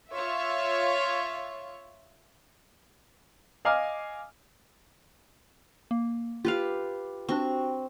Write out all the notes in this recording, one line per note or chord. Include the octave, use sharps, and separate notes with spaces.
F4 C#5 E5
D#5 F5 G#5 D6 F6
A#3
F4 G4 B4 F5
C4 D4 F#4 C#6